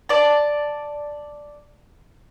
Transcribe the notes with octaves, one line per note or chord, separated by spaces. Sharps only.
D5 A5